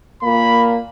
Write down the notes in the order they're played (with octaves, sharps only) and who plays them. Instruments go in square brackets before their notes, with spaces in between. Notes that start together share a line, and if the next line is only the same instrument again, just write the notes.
[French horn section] A#2 A#3 [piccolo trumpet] B5